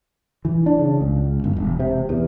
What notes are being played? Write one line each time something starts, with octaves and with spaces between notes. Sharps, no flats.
E3
D4
C#3
C#2
G1
E1
C3
E2